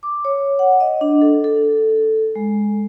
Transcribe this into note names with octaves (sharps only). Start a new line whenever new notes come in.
D6
C#5
F#5
D#5
D4
A4
A4
G#3